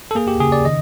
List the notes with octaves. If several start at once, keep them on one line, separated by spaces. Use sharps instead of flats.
A4
A#3 G#4
G4
C#3 G#4
D5
D#3 D#5